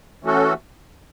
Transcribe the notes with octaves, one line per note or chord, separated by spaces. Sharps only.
E3 A3 C#4 F#4 A4